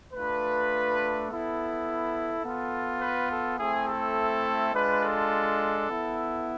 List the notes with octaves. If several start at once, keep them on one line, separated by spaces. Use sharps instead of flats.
A3 D4 F4 B4
B3 E4 A4
B3 F4
B4
A4
A3 C4 E4 G#4
A4
G#3 D4 F4 B4
A4
B3 E4